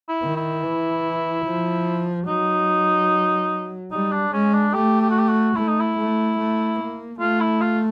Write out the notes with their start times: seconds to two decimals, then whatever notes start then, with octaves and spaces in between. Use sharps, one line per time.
0.09 E4
0.23 D#3
0.36 E4
0.63 E3
1.45 F3
2.27 F#3 D#4
3.92 G3 D#4
4.12 D4
4.33 G#3 C#4
4.54 D4
4.73 A3 G4
5.01 G4
5.10 F#4
5.19 G4
5.29 F#4
5.56 A3 E4
5.68 D#4
5.80 E4
5.98 A3
6.38 A3
6.79 A#3
7.20 A3 F4
7.40 E4
7.61 F4